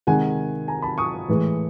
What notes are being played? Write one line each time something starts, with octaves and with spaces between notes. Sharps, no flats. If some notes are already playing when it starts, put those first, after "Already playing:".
C3 D#3 G#3 F#5 G#5
G#5 A#5
A5 B5
C#6 D#6
A2 E3 G#3